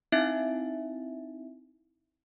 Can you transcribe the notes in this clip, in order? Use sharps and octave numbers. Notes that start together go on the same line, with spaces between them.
C4 D#4 E4 E5 A6